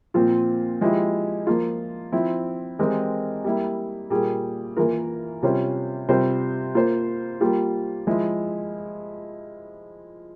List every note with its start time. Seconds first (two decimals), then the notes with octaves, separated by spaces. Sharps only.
0.14 A#2 F3 C4 F4
0.81 F3 G#3 E4 G4
1.47 F3 A#3 F4
2.12 F3 C4 E4
2.79 E3 G#3 C4 G4 A#4
3.44 G3 A#3 E4
4.10 A#2 G3 A#3 F4 G#4
4.77 E3 A#3 F4 A#4
5.42 C3 G3 C#4 F4 C5
6.08 C3 G3 C4 F4 C5
6.75 A#3 F4 C5
7.41 G3 A#3 F4
8.07 F3 G#3 E4